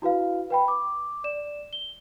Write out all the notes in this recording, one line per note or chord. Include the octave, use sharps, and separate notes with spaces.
E4 F#4 B4 F5
B4 G5 B5
D6
D5 E7
G7